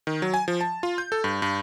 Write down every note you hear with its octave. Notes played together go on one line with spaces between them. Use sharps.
D#3
F#3
G#5
F3
A5
F4
G6
A4
G2
G2